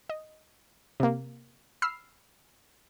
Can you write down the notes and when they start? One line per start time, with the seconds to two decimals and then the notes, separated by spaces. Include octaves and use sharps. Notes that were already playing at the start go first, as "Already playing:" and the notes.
0.10 D#5
1.00 C3 A#3
1.82 B5 E6 F6 C7